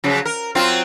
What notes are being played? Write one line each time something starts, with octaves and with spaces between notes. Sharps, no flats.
C#3 F3 F#3
A#4
F#3 C4 F4